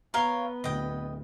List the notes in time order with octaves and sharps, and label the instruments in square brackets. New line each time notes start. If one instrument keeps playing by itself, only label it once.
[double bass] B3 [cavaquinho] A#4 C#5 F5 [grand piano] A#5 G7
[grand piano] D1 D2 [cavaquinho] D#5 G5